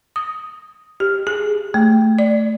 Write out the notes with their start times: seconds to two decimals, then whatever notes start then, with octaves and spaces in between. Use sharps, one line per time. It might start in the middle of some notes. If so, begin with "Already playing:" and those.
0.16 D#6
1.00 G4
1.27 G#4
1.74 A3
2.19 D5